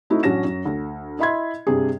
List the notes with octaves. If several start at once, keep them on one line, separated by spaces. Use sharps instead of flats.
A3 C4 D#4 E4 F#4
A1 F#3 C#4 D4 A#6 E7
F#2
D2
E4 D#5 E5 B5 C6 G#6
G2 C3 G#4